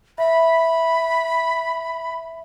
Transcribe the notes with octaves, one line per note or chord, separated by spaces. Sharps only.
E5 B5